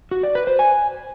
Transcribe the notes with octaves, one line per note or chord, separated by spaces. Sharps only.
F#4
D5
B4
C5
G#5